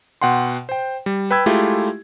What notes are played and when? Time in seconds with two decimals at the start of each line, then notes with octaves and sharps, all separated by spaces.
0.22 B2 F#5 G5 C6
0.69 C5 G5
1.06 G3
1.31 B4 G5 B5 E6 G#6
1.46 G#3 A3 E4 F4 G4